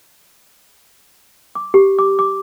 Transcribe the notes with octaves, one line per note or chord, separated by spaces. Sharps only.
D6
G4
D6
D6